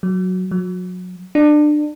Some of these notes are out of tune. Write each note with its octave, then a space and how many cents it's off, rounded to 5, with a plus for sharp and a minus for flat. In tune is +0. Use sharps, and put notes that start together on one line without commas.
F#3 -5
F#3 -30
D4 +25